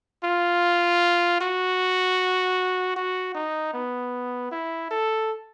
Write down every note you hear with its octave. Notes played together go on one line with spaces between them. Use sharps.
F4
F#4
F#4
D#4
B3
E4
A4